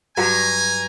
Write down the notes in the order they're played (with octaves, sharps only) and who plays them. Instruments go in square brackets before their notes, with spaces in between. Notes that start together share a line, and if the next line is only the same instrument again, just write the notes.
[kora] G2 F#3 F#4 [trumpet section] G#5 A#5